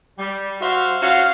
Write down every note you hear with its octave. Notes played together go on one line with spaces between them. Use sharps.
G3
F#4 C5 E5 F5
C#4 F#4 F5